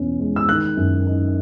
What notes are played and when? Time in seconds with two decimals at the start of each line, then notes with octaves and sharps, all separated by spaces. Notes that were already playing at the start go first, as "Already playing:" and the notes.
Already playing: E2 B2 C#4
0.20 G#3
0.36 E6
0.49 D#3 F#6
0.77 F#2
1.06 D#4